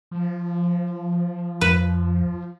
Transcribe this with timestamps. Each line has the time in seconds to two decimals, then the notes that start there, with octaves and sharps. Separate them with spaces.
0.11 F3
1.61 F2 B4